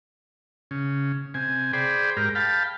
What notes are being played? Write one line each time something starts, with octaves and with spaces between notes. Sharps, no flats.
C#3
C3 G#5
G#4 C5 D5 G5 B5
G#2 G4 A#4 F6
F5 G5 A5 B5